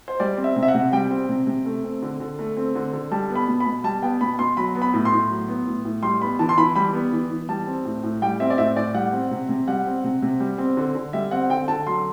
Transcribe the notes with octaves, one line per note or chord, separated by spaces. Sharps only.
C5
G3 D5
C4
E5
C3
E5
F#5
C3
G3 G5
C4
C3
C3
A3
C4
D3
D3
A3
C4
D3
D3
G3 A5
B3
B5
B2
B5
B2
G3 A5
B3 G5
B2 B5
B2 C6
F#3 B5
B3
B5
A2
C6
A2
F#3
B3
A2
A2
G3 C6
B3 B5
E3 A5
C6
E3 B5
G3 B5
B3
E3
E3
G3 A5
C4
A2
A2
G3 G5
C4 E5
D5
A2 E5
A2 D5
G3 F#5
C4
C3
C3
G3 F#5
C4
C3
C3
G3
C4
D3
D3
G3 E5
C4 F#5
D3 G5
D3 A5
F#3 C6